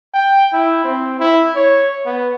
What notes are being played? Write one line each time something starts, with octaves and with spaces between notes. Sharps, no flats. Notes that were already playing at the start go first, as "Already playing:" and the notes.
G5
E4
C4
E4
C#5
B3